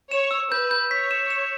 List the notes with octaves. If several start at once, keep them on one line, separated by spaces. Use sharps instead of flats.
C#5 E7
E6
B4 G6
G6
C#5 B6
E7
E7